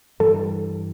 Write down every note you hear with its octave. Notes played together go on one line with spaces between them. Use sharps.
G2 E3 G3 A4